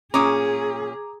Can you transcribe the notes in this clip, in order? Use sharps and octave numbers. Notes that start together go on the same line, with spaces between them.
A#2 C#4 G#4 A#5 D6 D#6